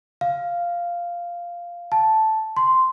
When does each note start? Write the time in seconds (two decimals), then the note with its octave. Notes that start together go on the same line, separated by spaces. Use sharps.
0.21 F5
1.92 A5
2.57 C6